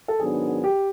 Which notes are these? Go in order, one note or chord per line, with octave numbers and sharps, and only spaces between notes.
A4
G#2 D#3 F#3 B3 D4 G#4
G4